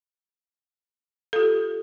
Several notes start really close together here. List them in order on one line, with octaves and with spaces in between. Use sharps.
A4 F4 G4